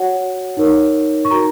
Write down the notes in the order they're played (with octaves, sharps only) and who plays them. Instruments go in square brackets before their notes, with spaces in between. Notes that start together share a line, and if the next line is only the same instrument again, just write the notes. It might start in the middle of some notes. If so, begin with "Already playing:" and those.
Already playing: [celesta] F#4 C#5 F#5
D#4 A#4 C#5
C#6
D#4 F#4 A#4 A#5